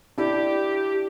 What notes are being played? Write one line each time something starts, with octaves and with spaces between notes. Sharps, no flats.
D4 E4 G4